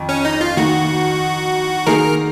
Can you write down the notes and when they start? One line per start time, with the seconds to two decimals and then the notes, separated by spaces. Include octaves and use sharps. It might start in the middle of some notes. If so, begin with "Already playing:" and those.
Already playing: F2 D#3
0.09 C#4
0.25 D#4
0.41 F4
0.57 D#3 A#3 D#4 F#4
1.87 D#3 A#3 D#4 G#4 A#4